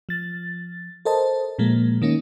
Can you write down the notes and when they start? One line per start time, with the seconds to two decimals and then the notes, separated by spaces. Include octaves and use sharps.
0.09 F3 A6
1.05 A4 A#4 C5 D#5 A5
1.59 A#2 F3 G#3 A#3
2.02 D#3 A#3 C#4 D#4